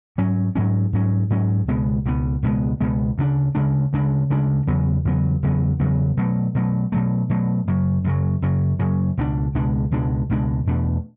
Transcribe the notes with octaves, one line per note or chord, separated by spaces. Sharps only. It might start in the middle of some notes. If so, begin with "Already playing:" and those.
G#2 F#3 C#4
G#2 F#3 C#4
G#2 F#3 C#4
G#2 F#3 C#4
C#2 B2 G#3 B3
C#2 B2 G#3 B3
C#2 B2 G#3 B3
C#2 B2 G#3 B3
D2 C#3 G#3 D4
D2 C#3 G#3 D4
D2 C#3 G#3 D4
D2 C#3 G#3 D4
E2 C#3 F#3 B3
E2 C#3 F#3 B3
E2 C#3 F#3 B3
E2 C#3 F#3 B3
B2 F#3 A3
B2 F#3 A3
B2 F#3 A3
B2 F#3 A3
F#2 C#3 F#3
F#2 C#3 F#3
F#2 C#3 F#3
F#2 C#3 F#3
C#2 B2 G#3 D4
C#2 B2 G#3 D4
C#2 B2 G#3 D4
C#2 B2 G#3 D4
E2 B2 A3 D4